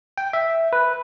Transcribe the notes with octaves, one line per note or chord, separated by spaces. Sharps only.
G5
E5
B4